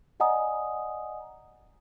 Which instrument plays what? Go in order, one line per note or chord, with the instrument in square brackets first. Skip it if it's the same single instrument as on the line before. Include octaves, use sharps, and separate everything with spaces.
[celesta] D5 D#5 F#5 G#5 A#5 D#6